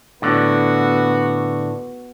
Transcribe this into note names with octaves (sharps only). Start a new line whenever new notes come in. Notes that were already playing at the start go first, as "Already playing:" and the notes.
A2 D3 B3 F#4